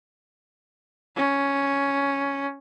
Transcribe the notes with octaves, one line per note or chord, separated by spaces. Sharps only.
C#4